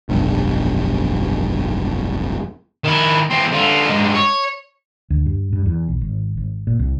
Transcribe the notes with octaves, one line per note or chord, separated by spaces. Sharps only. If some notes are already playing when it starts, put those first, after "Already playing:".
F1 B1 G2
D#3 E4
E3 C4
D3 F4
G2 G#3
C#5
D2
G2
G2
E2
B1
G#1
G#1
A#2
C2